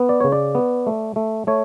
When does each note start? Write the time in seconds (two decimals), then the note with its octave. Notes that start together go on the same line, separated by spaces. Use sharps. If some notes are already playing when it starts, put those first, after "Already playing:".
Already playing: B3
0.09 D5
0.20 C#3 C#5
0.32 D5
0.55 B3
0.87 A3
1.16 A3
1.47 A3 C#5